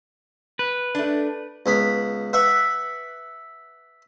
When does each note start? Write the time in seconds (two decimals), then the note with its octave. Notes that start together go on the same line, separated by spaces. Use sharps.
0.59 B4
0.95 A3 D4
1.66 C#2 B3 B5
2.33 B4 E5 F#5 B5 C#6